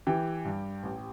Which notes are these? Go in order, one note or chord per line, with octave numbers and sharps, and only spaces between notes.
E3 G4 G5
G2
A1